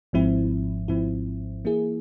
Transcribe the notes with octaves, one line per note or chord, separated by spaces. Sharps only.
G#1 G#2 F3 C4 E4
G#1 G#2 F3 C4 E4
E3 A#3 E4 G#4